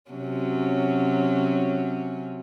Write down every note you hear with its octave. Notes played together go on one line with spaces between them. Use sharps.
C3 F#3 C#4